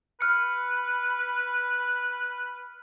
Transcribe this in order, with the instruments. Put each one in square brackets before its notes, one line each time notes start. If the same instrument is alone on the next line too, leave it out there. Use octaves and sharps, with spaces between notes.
[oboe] B4 [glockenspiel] F6 C#7